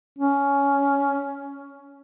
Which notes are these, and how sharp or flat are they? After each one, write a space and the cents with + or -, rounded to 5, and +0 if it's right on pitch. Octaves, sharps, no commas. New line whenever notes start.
C#4 +15